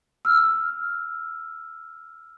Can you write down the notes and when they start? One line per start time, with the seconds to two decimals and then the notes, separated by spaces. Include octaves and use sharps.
0.25 E6 F6